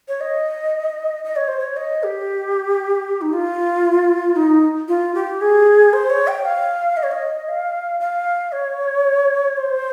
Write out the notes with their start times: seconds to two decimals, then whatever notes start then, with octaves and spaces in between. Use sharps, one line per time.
0.08 C#5
0.21 D#5
1.25 D#5
1.36 C#5
1.48 C5
1.59 C#5
1.77 D#5
2.03 G4
3.21 D#4
3.33 F4
4.36 D#4
4.88 F4
5.15 G4
5.41 G#4
5.93 C5
6.10 C#5
6.27 G5
6.45 F5
6.97 D#5
7.03 C#5
7.11 D#5
7.48 F5
8.00 F5
8.52 C#5
9.57 C5